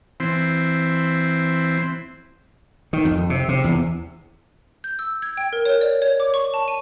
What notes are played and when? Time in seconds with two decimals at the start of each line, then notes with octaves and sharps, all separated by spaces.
0.20 E3 C4
2.93 D#3
3.05 F2
3.30 C3
3.48 C3
3.64 E2
4.84 G6
4.99 E6
5.22 G#6
5.37 G5
5.53 A#4
5.65 C#5
5.81 D5
6.02 C#5
6.20 D6
6.34 C#6
6.54 A5
6.68 D#7